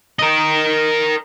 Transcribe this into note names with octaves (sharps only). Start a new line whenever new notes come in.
A#4 D#5